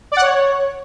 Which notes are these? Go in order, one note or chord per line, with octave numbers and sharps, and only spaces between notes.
D5
F#5
C#5